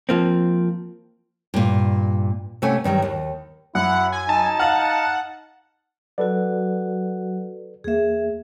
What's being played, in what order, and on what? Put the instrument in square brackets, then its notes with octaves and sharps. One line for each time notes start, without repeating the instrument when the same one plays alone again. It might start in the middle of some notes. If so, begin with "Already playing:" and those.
[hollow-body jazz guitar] F3 A#3 C4
[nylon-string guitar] G2 A#2
C3 A3 C#4 F#4 G#5
G2 D#3 F#3 G3
D#2
[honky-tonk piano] F#2 [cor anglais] E4 [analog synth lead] F#5
[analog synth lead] G#5
[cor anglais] D#4 [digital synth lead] A5
[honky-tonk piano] F5 F6 [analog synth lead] F#5
[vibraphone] F#3 F#4 [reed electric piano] A4 B4 D5
[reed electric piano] E2 A#3 [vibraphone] G#4 E5